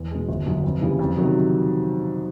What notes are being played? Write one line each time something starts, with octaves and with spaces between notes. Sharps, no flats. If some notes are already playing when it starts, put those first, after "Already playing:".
Already playing: E2
B2 G#3
G1
F#2 D3
F2
C#3 E3 G3
F2
C3 D#3 F#3